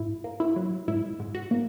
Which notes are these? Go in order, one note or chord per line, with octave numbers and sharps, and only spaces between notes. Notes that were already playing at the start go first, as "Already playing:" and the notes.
Already playing: G#2 E4
A#3
E4
F#3
G#2 E4
G#2
F#4
A#3